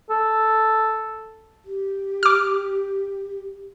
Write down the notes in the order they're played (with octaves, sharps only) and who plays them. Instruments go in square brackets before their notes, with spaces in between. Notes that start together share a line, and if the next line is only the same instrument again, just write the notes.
[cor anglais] A4
[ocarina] G4
[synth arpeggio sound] D6 F6